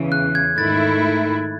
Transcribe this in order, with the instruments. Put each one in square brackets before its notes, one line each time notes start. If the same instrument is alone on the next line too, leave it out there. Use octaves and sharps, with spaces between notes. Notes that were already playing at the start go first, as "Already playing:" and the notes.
Already playing: [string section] E2 C#3 E3
[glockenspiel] F#6
G#6
[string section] G#2 D#3 A3 E4 [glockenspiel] A6